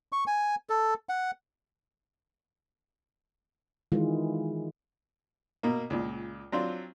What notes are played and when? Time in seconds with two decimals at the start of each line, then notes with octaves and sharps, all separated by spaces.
0.12 C#6
0.27 G#5
0.70 A4
1.09 F#5
3.92 D#3 E3 G#3 F4
5.63 B2 A#3
5.90 C#2 A#2
6.52 F#3 C4 D4 F4